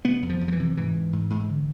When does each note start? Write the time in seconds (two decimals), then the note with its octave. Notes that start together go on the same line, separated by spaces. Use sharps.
0.04 C3 B3
0.22 F2
0.29 F3
0.41 F2
0.48 F3
0.52 E3
0.59 C3
0.77 G#2 E3
0.94 G#2
1.13 G#2
1.30 G#2
1.49 D3